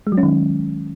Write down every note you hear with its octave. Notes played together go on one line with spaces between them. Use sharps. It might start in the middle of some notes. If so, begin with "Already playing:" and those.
G#3
F#3
C#4
D#3